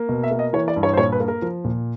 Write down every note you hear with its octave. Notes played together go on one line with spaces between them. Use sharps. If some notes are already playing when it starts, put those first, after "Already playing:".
Already playing: A#3
B2
E5
A#3
D#5
E3 C#5
D5
G2
C#5
C5
A#2 C#5
B4
A#3
A#4
F3
A#2